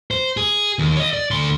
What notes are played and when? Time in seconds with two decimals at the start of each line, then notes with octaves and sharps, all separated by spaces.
0.11 C5
0.37 G#4
0.79 D#2
0.97 C#5 D#5
1.13 D5
1.31 D2 C6